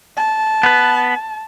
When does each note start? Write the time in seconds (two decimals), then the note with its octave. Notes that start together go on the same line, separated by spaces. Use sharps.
0.17 A5
0.63 B3 B4